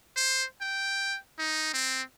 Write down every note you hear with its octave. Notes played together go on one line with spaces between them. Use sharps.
C5
G5
D#4
C4